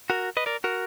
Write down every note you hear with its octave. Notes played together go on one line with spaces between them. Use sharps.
F#4 A#4
B4 D#5
A#4 D5
F#4 A#4